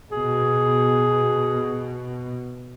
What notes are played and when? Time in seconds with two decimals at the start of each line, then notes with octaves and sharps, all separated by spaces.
0.12 B2 G#4